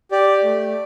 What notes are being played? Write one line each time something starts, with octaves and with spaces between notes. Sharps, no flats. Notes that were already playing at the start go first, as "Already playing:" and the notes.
G4 D5
A3